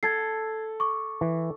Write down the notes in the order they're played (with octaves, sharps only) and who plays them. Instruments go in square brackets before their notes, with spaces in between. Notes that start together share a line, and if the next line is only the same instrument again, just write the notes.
[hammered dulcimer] A4 [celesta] G#6 A6 C7
[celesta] C#6 D6
[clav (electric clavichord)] E3